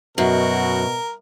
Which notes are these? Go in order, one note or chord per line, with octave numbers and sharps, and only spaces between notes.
F#2 B2 F#4 A#4